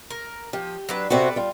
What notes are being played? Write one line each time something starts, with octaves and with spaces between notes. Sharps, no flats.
A#4
F3 G4
F#3 D4 B4
C3 C4 F#4 A4 B4 D5
G3 F4